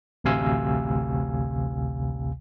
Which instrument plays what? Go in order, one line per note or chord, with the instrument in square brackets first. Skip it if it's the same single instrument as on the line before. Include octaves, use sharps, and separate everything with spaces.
[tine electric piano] A1 D2 C3 F5 G#5 E6